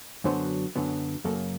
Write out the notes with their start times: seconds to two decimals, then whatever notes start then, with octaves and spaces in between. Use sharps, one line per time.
0.24 F#2 D3 F#3 B3 C5
0.76 F#2 D3 F#3 B3
1.24 F#2 C#3 F#3 A#3 A4